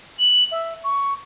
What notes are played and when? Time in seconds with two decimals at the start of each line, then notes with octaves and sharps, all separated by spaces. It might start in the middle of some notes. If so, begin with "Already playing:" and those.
0.19 F#7
0.52 E5
0.84 C#6